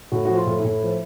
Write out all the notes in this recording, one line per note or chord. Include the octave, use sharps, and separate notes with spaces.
A2 F#4
F3 F#4
F4
A2
E4
A2
F3